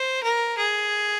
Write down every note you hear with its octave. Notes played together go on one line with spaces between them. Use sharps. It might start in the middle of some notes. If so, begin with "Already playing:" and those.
Already playing: C5
A#4
G#4